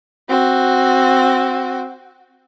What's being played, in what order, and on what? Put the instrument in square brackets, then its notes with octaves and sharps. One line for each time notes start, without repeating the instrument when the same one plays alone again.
[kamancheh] C4 F#4